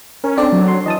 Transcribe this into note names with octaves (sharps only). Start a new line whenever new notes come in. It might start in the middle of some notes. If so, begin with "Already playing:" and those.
C#4 A#4
C4 D4 A4 D5
F#3
C6
E3 D#5 A5 D#6